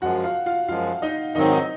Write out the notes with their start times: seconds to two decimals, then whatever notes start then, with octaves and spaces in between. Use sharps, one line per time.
0.02 F#2 F3 G#3 F#4 F#5
0.24 F4 F5
0.46 F4 F5
0.68 F#2 F3 G#3 F4 F5
1.02 D#4 D#5
1.35 G#2 D#3 F#3 C4 D#4 D#5
1.52 D#4 D#5